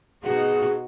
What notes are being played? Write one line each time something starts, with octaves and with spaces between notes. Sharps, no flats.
B2 D#4 F#4 G#4